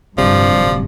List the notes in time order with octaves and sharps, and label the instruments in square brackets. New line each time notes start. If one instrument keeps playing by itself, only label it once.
[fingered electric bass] D1 C3 [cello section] G2 [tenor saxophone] F3 [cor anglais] D5